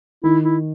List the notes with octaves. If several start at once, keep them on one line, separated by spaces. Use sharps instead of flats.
D#3 E4
E4